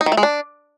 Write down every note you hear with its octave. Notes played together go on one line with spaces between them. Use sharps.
D#4
D#3
A3
G#3
D4